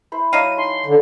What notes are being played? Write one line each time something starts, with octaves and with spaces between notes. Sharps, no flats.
E4 C5 B5
F#3 D#5 F5 D#7
D#4 G#5 A5 C6
D3